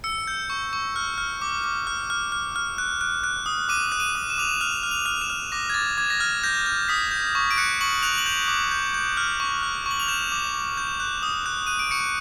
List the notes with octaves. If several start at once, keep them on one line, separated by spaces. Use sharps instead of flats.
E6 C#7
G6
C#6
C#6
F6
F6
D6
D6
F6
F6
F6
F6
F#6
F#6
F#6
D#6
D6 D#7
F#6
D#7
D6
E7
D6 F7
E7
F6 F7
F6
F7
F6
E7
F6
D6 A#6
G#6
D6 A6
D6 G#6
A#6
F6 A6
G6 A#6
G6
D#6 B6
G6
C#6
D7
F#6 C#7
C#6 F#7
F#6 F7
F#7
G6 F7
D6
G6
G6
F6
C#6
F6
C#6
F#7
F7
G6 E7
D6
D6
G6
F#6
D#6
F#6
F#6 D#7
D7
C#6 C#7